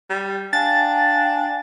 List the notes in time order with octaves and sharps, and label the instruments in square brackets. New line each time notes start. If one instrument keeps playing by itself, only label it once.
[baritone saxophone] G3
[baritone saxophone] D4 [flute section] F5 G5 G#5 [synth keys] A6